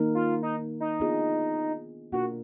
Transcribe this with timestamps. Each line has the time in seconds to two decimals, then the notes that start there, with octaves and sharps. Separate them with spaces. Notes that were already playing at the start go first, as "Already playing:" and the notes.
Already playing: D#3 A#3 D#4 A#4
0.15 F4
0.43 D#4
0.80 D#4
1.00 B3 D4 F4 G#4 D#5
2.12 B2 A#3 D4 F4 F#4 A#4